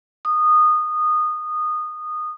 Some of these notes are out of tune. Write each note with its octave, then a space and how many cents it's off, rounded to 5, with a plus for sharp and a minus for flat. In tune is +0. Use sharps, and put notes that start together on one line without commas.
D#6 -20